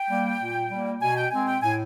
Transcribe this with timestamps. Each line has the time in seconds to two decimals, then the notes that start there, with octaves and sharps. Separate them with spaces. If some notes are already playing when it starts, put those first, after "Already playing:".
Already playing: G5
0.10 G3 A#3
0.40 A#2
0.71 G3 A#3
1.01 B2 G#5
1.17 G5
1.32 G#3 C4 G#5
1.48 G5
1.62 A2 G#5